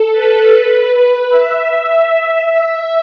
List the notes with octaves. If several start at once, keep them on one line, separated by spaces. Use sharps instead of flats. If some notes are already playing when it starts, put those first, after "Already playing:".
Already playing: A4
B4
E5